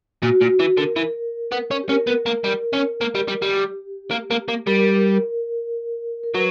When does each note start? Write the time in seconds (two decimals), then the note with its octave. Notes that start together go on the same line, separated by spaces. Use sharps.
0.22 A#2 F#4
0.41 A#2
0.50 F#4
0.59 E3
0.77 D3 A#4
0.96 E3
1.52 B3
1.71 C#4
1.84 G4
1.89 C#4 A#4
2.07 B3
2.26 A#3
2.44 G3
2.73 C#4
3.01 A#3
3.15 G3
3.28 G3
3.42 G3
3.56 G4
4.11 A#3
4.31 A#3
4.48 A#3
4.67 G3 A#4
4.96 A#4
6.23 A#4
6.34 F#3 B4